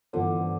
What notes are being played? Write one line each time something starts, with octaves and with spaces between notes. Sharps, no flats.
G2 D3 E3 B3 F4 C5